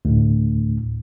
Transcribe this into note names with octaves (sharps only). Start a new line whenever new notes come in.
D2 A2